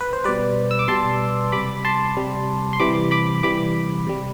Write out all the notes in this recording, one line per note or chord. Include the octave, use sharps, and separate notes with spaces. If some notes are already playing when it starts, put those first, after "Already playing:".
B4
C5
B2 G3 B4 D5
E6
D6
B2 G3 A5 C6
C3 G3 B5 D6
A5 C6
C3 G3
C6
C3 E3 G3 B5 D6
B5 D6
C3 E3 G3 B5 D6
C3 G3